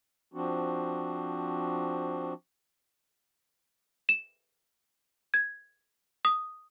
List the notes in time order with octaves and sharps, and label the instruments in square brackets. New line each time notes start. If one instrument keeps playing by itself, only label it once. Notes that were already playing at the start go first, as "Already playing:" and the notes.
[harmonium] F3 C4 D4 F#4
[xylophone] E7
G#6
D#6